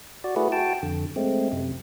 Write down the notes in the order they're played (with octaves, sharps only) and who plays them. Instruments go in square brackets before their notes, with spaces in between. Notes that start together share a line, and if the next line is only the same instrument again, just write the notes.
[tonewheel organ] F#4 D5
A3 E4 F#4 G#4 B4
F#4 G5 A5
F2 D3
G#3 A3 C4
F#2 C3